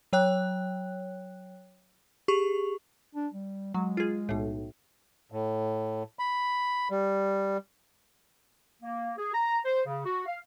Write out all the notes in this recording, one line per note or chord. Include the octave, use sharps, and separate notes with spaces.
F#3 C#5 G5 F#6
G4 G#4 C#6
D4
G3
F#3 G#3
F4 G#4
B1 A2
A2
B5
G3
A#3
G#4
A#5
C5
C#3
F#4
F5